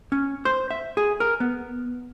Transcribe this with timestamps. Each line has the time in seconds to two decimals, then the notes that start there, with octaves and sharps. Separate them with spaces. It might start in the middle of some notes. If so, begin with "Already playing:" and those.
0.12 C#4
0.45 C5
0.71 E5
0.97 G#4
1.20 A#4
1.40 B3